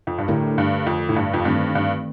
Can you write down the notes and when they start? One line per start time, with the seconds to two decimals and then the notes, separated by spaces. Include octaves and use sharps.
0.07 F2
0.18 G2
0.28 A2 D3 A3 D4 G4 A#4
0.58 G2
0.87 F2
1.09 A2
1.16 G2
1.34 F2
1.45 G2 D#3 A3 C4
1.75 G2